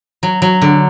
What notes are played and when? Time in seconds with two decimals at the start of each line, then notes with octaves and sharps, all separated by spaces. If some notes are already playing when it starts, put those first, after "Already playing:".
0.23 F#3
0.42 F#3
0.62 D3